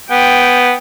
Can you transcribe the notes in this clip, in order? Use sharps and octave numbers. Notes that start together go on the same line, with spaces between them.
B3 G5